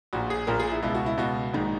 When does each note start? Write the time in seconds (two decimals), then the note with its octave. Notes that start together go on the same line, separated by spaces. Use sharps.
0.13 A#1 A#2 F#4
0.30 G#4
0.47 A#1 A#2 A#4
0.60 G#4
0.71 E4
0.83 C#2 B2 E4
0.94 F#4
1.06 E4
1.18 C#2 B2 F#4
1.53 A#1 G#2 D#3